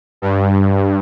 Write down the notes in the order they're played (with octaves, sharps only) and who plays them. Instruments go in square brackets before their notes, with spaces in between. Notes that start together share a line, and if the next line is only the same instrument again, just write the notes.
[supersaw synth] G2